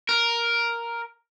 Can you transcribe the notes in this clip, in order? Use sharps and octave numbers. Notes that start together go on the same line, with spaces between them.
A#4